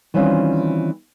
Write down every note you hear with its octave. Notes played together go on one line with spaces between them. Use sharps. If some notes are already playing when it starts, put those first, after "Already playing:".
D#3 E3 G3 C4 C#4 F4